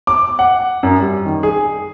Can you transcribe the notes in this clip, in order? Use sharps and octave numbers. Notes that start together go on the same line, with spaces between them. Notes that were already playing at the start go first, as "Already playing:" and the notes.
D6
F#5
F#2
G3
D#3
G#4